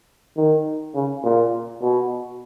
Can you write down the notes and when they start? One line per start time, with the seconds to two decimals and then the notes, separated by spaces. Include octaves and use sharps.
0.37 D#3
0.95 C#3
1.23 A#2
1.81 B2